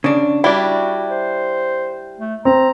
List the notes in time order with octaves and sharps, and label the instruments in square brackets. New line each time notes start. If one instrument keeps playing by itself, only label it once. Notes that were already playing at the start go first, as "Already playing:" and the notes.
[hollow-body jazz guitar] C#3 D4
[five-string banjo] G3 D4 [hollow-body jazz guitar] E4 [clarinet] F#4
[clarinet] C5
A3
[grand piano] C4 [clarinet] A#5